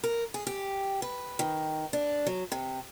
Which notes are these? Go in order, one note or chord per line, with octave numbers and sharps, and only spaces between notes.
A#4
G#4
G4
B4
D#3
D4
F#3
C3